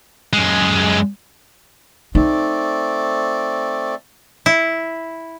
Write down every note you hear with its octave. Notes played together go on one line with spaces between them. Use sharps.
F#2 G#3
A3 C4 D#4 D5
E4